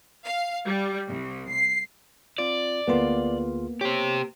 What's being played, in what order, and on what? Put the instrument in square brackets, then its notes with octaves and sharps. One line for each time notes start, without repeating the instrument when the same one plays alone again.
[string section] F5
G3
C2
C7
[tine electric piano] C4 F4 [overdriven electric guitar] D5
[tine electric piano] D2 F4 G#4 [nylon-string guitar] A#3 B3
[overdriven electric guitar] G4 C5 [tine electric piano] C#5